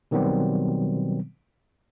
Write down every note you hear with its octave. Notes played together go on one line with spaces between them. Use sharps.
B2 D#3 F#3 G3 B3 C4